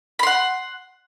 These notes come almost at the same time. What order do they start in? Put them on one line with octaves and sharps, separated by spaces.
B5 C6 F#5